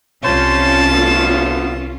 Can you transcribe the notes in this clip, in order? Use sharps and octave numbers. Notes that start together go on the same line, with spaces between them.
C2 C#4 F4 C5 C#5 A5
D2 A3 B3